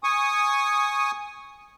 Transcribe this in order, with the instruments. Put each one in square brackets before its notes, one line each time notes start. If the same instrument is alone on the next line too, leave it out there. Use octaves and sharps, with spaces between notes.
[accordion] G#5 C#6 D#6